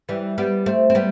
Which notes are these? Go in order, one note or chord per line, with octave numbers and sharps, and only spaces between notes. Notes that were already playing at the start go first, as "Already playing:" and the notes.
E3 G3
G3 B3
A3 C4
C4
G3 B3